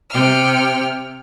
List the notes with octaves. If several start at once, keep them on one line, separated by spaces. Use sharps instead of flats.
C3 G5 F6